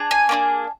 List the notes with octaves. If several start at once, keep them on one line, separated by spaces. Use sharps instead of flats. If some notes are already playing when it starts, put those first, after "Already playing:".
Already playing: D4 G#4
G#5
A#3 D4 F4 G#4